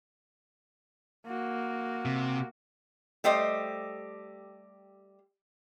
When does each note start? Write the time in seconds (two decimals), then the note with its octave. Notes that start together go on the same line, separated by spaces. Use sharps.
1.27 A#3 F#4
2.05 C3
3.24 G3 A3 G4 C5 D#5